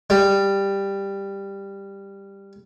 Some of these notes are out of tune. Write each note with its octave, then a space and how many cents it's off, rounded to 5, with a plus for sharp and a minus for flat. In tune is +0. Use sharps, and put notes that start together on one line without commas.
G3 +10